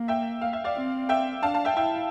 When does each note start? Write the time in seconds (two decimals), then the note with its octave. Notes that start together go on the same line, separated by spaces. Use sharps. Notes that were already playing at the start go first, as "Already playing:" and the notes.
Already playing: A#3
0.08 E5 G5
0.41 F5
0.53 E5
0.64 D5 F5
0.76 C4
1.09 E5 G5
1.43 D4 F5 A5
1.54 F5 A5
1.65 E5 G5
1.77 E4 E5 G5